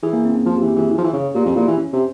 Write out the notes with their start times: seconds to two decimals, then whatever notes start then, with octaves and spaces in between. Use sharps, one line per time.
0.03 E3 G#4
0.13 A#3
0.25 C4
0.36 C#4
0.46 F3 F4
0.58 G4
0.62 E3
0.69 G4
0.76 E3 G#4
0.91 E3
0.98 F3
1.04 E3
1.13 C#3
1.34 A#2 G4
1.46 F2
1.56 A#2 E4
1.68 E3
1.77 C#4
1.93 C3